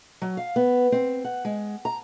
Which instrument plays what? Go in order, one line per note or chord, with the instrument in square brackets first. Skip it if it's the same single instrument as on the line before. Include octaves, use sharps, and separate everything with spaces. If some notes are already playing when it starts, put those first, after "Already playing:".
[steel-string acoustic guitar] F#3
F5
B3
C4
F#5
G#3
A#5